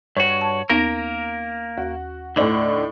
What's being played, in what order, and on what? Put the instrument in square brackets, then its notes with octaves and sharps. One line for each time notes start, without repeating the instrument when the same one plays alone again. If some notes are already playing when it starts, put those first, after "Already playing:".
[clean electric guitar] G2 F#4 [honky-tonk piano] C#5
[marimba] A5
[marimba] D#2 B3 D#4 [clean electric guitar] A#3 A#4 [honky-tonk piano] A#6 D7
[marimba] D#2 [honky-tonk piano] F#4
[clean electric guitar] D2 D3 [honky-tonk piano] A2 D4 D#4